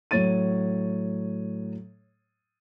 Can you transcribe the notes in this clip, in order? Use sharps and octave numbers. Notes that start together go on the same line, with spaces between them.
A2 F#3 C#5 A6 D#7